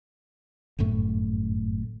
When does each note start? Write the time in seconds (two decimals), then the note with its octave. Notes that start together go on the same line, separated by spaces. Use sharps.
0.79 G1 F#2 A2 A3